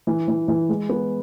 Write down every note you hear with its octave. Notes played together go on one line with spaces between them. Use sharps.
E3
E3
E3
G#3
B3